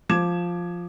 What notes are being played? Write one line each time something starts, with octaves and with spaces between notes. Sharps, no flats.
F3 D6 G#6 E7